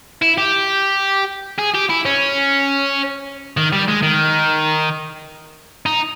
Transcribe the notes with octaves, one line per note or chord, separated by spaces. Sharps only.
E4
G4
G#4
G4
E4
C#4
D#3
G3
G#3
D#3
D#4